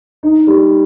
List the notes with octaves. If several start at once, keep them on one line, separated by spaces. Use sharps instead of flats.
D#4
G3